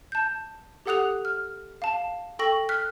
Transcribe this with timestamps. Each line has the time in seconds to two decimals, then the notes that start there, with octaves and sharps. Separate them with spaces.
0.12 A5 G6
0.86 G4 A4 F#5 D#6 F#6 F7
1.25 F6
1.82 F5 A5
2.39 A4 G5 C#6 A#6 F#7
2.69 F6 F#6 B6